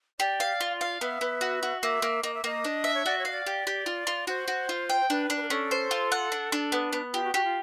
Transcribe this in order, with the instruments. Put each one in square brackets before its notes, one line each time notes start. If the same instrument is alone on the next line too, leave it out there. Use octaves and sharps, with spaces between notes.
[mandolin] G4 [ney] D5
[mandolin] F5
F4
F5
[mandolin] B3 [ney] E5
[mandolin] B3
F#4
F#4
[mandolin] A#3 [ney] E5
[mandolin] A#3
[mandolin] A#3 [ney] D#5
[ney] E5
[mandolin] A#3 [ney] D#5
[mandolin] D4
E5
[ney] C#5
[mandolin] F#4 [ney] D5
[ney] C#5
[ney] D#5 [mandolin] F5
[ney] D5
[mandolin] G4
G4
F4
F4
[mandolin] F#4 [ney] C5
[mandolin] F#4
F4
G5
[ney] C5
[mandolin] D4 [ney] B4
[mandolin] D4
[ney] B4
A#4
[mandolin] C#4 [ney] A4
[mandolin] C5
F4
F#5
D4
D4
B3
B3
[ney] F4 [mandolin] G4
[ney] F#4
[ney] F#4 [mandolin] G4
[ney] F4